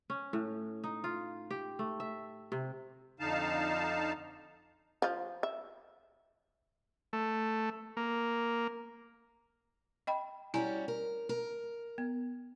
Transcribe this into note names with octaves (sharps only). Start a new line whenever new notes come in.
C#4
A2
D#4
F4
G4
A3
E5
C3
F2 D3 D#4 F5 A5
F3 F4
E5
A3
A#3
D#5 G5 B5
G3 C#4 E4 F#4 G#5 A#5
A#4
A#4
B3